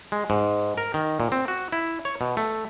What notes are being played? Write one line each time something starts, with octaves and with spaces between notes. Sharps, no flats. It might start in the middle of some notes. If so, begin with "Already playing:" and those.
G#3
G#2
A#4
D#3
A#2
C4
F#4
E4
C#5
B2
A3